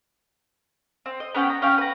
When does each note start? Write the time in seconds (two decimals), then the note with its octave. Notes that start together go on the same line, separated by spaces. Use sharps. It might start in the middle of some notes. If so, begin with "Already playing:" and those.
1.06 C4
1.20 D#5
1.35 B3 C#4 F#5 G5
1.50 A#5
1.62 C#4 F5 G5
1.78 B4 A#5